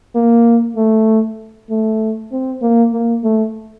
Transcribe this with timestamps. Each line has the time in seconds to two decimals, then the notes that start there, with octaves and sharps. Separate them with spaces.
0.15 A#3
0.76 A3
1.70 A3
2.32 C4
2.62 A#3
2.93 A#3
3.24 A3